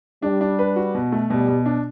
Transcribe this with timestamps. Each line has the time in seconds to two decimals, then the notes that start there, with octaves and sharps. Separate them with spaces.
0.22 G3 D4
0.41 D4
0.59 B4
0.76 F#4
0.95 B2
1.12 A3
1.30 B2 G3
1.48 B2
1.66 D4